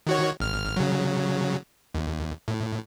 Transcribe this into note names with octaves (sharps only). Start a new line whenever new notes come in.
D#3 F#4 C#5
G#1 F6
C#3 F#3
D#2
A2